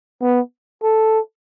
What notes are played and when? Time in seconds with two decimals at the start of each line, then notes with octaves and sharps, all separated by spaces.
0.22 B3
0.83 A4